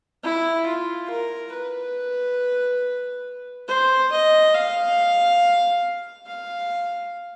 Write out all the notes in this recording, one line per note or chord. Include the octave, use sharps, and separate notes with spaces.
E4
F4
A#4
B4
C5
D#5
F5
F5